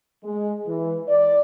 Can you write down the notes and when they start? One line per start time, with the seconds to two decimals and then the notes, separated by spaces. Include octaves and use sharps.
0.24 G#3
0.67 E3
1.09 D5